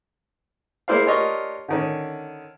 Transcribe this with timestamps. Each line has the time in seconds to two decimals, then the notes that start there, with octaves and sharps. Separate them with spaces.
0.88 G#3 A#3 E4 C5 D5 F5
1.06 D4 F4 G4 A#4 C#5 D#5
1.68 D3 D#3 C#4